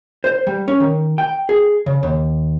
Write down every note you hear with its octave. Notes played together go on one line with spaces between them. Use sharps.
C5
G3
C#4
D#3
G5
G#4
C#3
D#2